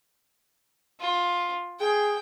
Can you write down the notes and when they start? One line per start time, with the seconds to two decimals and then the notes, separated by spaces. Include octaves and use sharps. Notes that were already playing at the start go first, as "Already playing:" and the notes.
1.00 F4
1.80 G#4 G5